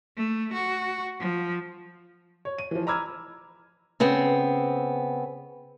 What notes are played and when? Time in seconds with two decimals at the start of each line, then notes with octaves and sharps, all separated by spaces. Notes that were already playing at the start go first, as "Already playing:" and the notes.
0.17 A3
0.53 F#4
1.20 F3
2.45 C#5
2.58 D#7
2.71 E3 F3
2.87 A#5 B5 D6 E6 F6 G#6
4.00 C#3 B3 C4